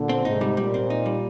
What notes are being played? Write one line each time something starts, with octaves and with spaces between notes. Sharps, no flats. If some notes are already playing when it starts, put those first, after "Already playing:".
Already playing: A#2 D3
C4
G#2 C3 D#4
G3
A#2 G3
C4
D#4
G3